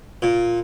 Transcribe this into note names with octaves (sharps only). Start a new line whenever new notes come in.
A#2